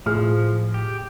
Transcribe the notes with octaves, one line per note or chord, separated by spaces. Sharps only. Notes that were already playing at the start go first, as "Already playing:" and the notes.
A2 F3 G#4 F6
G4